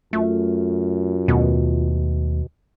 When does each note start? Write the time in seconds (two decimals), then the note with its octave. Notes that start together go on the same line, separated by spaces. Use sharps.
0.13 F#2 A3 F4
1.28 D#2 B2 A3 B3